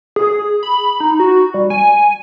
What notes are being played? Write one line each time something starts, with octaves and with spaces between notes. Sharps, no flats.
G#4
B5
D#4
F#4
G3
G#5